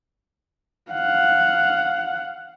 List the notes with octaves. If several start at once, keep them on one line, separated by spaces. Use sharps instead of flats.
F5 F#5